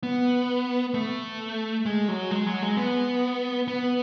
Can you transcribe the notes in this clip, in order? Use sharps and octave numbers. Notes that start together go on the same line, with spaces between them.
B3
A3
G#3
F#3
G#3
F#3
G#3
B3
B3